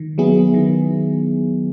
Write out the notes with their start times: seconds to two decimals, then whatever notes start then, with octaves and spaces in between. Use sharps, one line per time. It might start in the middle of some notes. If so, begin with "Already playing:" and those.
Already playing: D#3
0.18 F#3 B3 E4 G#4
0.54 D#3